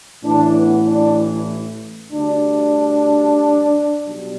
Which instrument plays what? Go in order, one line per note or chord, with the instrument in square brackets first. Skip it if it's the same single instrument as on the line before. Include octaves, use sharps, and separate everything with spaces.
[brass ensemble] A1 A2 E3 D4
B3
D4
D2 D3 G3 D4
B1 B2 G3